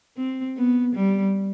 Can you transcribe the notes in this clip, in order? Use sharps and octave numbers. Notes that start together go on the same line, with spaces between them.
C4
B3
G3